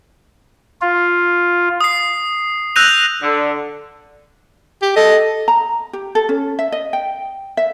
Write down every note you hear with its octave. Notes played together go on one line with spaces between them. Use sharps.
F4
D#6 C7
E6 F#6 G6 A#6 D#7 F7
D3
G4
A4 D#5
A#5
G4
A4
C#4
E5
D#5
G5
E5